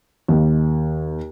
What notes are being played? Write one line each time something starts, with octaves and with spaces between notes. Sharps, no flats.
D#2